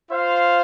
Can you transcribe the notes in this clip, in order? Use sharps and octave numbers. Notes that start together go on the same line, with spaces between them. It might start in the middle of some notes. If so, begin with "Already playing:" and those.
F4 C5 F5